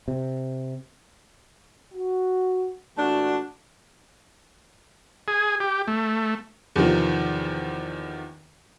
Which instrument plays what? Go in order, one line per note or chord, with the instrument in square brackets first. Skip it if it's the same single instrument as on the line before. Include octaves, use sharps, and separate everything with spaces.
[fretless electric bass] C3
[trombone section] F#4
[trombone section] A#2 E3 F#4 [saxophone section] A3 D4
[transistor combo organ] G#4
G4
A3
[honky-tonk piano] E2 C3 D#3 F3